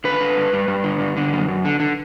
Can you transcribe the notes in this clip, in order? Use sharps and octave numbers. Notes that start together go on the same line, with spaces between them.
D3 B4
D3
G2
G2
G2
D3
G2
D3
F#2
F#2
D3
D3